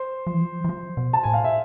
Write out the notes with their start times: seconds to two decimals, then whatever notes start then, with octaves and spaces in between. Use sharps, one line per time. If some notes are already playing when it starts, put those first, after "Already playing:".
Already playing: C5
0.27 F3
0.34 E3
0.41 F3
0.64 E3
0.69 F3
0.97 B2
1.13 A5
1.23 A2 G#5
1.34 F5
1.44 E5